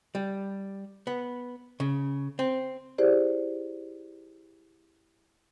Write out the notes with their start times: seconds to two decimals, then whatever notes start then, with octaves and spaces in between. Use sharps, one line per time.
0.15 G3
1.07 B3
1.80 C#3
2.39 C4
2.98 E4 G4 G#4 C5 D5